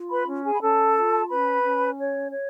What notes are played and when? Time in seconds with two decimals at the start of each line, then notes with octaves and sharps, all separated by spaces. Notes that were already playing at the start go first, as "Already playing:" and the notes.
Already playing: F4
0.10 B4 B5
0.27 C#4
0.45 G#4 G#5
0.54 B5
0.61 C#4 A4 A5
0.95 F4
1.29 C#4 B4 B5
1.64 C#4
1.98 C#5
2.32 C#5